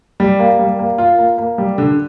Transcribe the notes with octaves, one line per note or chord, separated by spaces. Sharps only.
G3
A#3
G3
A#3
F4
A#3
A#3
G3
D3